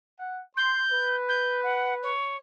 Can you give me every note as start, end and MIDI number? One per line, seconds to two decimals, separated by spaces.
0.20 0.42 78
0.57 0.83 84
0.57 1.15 91
0.92 2.14 71
1.28 1.60 91
1.63 1.94 78
2.03 2.36 73